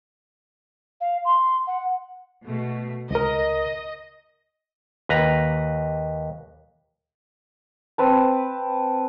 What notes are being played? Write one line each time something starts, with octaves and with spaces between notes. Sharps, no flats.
F5
C6
F#5
B2 A3
C#2 A#4 D#5
D#2 B4 A#5
C4 B4 A5